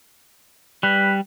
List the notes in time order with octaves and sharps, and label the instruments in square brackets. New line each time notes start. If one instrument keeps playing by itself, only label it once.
[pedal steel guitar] G3 [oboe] B4